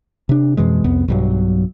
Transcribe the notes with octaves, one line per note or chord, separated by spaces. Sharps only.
C3 D4
F2 B2 E3 G#3
C2 F2 B3
B1 G2 F#3